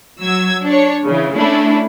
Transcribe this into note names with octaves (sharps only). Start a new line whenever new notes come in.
F#3 E6 G#6
D4 C#5
C#3 E3
A3 C#4 D4 E4